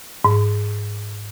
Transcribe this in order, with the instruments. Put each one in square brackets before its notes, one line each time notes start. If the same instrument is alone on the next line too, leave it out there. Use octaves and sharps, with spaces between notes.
[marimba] G#2